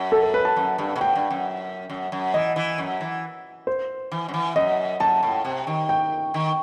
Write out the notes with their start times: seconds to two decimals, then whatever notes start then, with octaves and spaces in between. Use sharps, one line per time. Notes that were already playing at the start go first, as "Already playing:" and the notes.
Already playing: F#2
0.12 A4
0.23 A4
0.34 B4
0.45 A5
0.56 F#2
0.78 G2
0.96 B2
1.01 A2 G5
1.16 G2
1.30 F#2
1.90 F#2
2.12 F#2
2.34 E3 D#5
2.56 E3
2.78 F#2
3.01 E3
3.67 C5
4.12 E3
4.28 F#2
4.34 E3
4.56 F#2 D#5
5.00 F#2 A5
5.23 A2
5.45 C3
5.67 D#3
5.89 G5
6.34 D#3